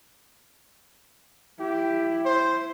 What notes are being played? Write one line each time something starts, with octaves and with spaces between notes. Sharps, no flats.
E4 G4
C5